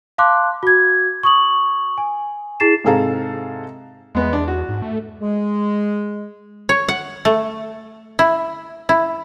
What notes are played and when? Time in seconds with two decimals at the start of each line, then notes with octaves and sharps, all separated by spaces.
0.18 F5 A5 C6 D6 F#6
0.63 F#4 G#6
1.23 C#6 D#6 F#7
1.98 G#5
2.60 E4 G#4 A6 C7 E7
2.84 G#2 C3 G#4 A4 F5 A#5
4.15 E2 G#3 B3
4.33 D4
4.48 F#4
4.69 G#2
4.82 A3
5.20 G#3
6.69 C#5
6.88 F#5
7.25 A3
8.19 E4
8.89 E4